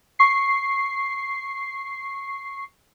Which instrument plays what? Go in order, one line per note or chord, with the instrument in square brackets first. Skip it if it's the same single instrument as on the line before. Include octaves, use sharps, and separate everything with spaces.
[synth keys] C#6 C7